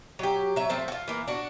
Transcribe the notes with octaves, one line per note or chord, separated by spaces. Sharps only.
F#3 G4
F#3 E5
F3 A3 C4
F4 F#4
E3 A#3
D4 F#4